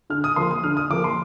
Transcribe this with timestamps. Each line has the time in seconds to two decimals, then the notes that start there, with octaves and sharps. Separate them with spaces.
0.10 D3 F6
0.24 D#6
0.36 F3 A#3 C6
0.51 D#6
0.64 D3 F6
0.77 D#6
0.90 F3 A#3 D6
1.04 C6